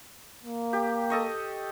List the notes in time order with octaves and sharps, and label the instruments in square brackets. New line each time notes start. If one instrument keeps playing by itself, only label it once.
[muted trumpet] A#3
[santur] G4
A4 D#5 C#6